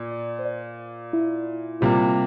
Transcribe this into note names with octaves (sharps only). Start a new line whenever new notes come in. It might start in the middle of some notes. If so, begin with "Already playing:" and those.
Already playing: A#2 D5
D5
C5
D5
E4
C3 G3 A#3 F4